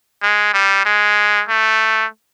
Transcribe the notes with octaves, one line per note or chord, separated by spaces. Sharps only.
G#3
G3
G#3
A3